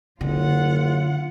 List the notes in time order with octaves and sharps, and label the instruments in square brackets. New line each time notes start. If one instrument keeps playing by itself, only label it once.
[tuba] F#1 [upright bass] D3 [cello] F4 F#5